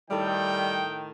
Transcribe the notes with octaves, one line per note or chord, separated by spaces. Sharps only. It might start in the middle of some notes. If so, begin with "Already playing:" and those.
A2 D#3 G3 A4 G5